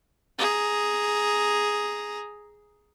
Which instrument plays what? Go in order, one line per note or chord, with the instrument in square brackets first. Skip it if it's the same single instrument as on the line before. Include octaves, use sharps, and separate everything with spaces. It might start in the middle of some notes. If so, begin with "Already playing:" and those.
[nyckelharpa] G#4 A#5